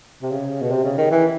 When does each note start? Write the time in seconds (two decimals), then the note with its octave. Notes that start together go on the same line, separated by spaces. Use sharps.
0.22 C3
0.31 C#3
0.62 B2
0.70 C3
0.84 C#3
0.98 D#3
1.11 E3